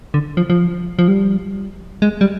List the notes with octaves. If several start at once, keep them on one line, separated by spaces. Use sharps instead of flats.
D3
F3
F3
F3
G3
G#3
G3